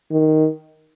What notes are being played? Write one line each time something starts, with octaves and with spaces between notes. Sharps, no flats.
D#3